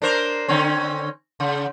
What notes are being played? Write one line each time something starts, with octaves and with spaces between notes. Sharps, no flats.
D4 A#4 C5
D3 C4 C#4
C#3